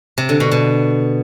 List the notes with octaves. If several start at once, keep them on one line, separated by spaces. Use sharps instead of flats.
C3
D3
B2
B2